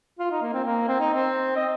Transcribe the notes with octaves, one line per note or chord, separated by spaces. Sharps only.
F4
D#4
A#3
C4
A#3
C4
D#4
C4
D#5